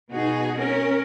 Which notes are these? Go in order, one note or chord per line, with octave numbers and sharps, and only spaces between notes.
B2 D#4 F#4 G#4
C#4 A#4